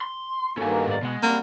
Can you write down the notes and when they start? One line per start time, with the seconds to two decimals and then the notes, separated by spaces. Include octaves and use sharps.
0.01 C6
0.57 G2 D#3 A#3 B3 C#4 F#4 A4 G#5
0.87 G#2 D5
1.03 B2 G#3 B3 F#5
1.23 C#3 G3 A#3 C4 F#5